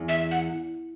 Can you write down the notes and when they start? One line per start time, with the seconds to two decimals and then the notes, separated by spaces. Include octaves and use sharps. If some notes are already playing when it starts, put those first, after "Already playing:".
Already playing: E2
0.08 E5
0.31 F#5